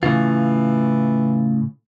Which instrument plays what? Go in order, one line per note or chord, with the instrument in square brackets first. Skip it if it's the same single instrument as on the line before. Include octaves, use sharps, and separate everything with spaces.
[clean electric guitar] A2 C#3 F4 [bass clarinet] E3